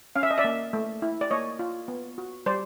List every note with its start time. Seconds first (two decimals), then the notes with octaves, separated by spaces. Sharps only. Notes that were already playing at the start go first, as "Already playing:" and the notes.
0.16 C#4 F5
0.23 E5
0.31 D#5
0.38 D5 E5
0.44 A#3
0.73 A3
1.02 E4
1.21 D5
1.31 A#3 C#5 D#5
1.59 F4
1.88 B3
2.18 F#4
2.46 G3 C5 D5